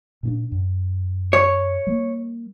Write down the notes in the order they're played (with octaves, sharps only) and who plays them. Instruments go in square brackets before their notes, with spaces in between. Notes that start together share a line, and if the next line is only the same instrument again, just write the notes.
[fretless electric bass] A#2 C#4 D4
F#2
[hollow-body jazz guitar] C#5
[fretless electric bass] G3 A#3